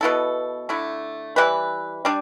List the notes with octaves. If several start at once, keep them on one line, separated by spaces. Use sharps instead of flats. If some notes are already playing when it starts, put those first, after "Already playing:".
B2 B3 E4 A4
D3 A3 E4
E3 G3 E4 B4
G3 D4